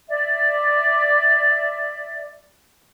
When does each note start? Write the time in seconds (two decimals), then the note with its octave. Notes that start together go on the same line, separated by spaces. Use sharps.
0.08 D5 E5